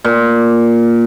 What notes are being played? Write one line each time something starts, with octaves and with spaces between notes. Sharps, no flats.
A#2